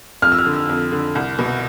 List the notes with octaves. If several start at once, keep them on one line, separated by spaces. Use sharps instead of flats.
F2 F6
E6
F6
D3
E6
F2
D3
C2
B2